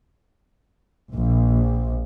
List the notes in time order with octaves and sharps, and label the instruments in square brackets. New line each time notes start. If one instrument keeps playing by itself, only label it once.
[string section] A#1